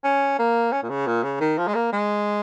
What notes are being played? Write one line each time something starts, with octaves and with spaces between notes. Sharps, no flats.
C#4
A#3
C#4
A#2
C#3
A#2
C#3
D#3
F3
G#3
A#3
G#3